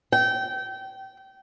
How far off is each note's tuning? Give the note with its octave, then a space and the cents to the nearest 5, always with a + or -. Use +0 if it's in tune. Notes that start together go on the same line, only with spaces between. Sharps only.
G5 -25